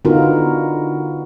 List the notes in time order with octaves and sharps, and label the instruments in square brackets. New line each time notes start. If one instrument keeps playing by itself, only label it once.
[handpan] D3 B3 D#4 F4 F#4 A#4